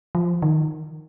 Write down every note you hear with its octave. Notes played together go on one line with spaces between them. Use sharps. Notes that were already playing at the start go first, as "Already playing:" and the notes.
F3
D#3